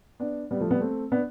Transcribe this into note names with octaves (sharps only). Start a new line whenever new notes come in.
B3 D4
G3 B3
F3 A3
G3 B3
A3 C4
B3 D4